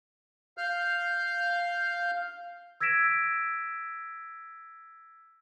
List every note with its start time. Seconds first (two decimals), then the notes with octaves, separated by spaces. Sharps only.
0.58 F5 F6 G6
2.80 E6 G#6 A#6 B6 D7 E7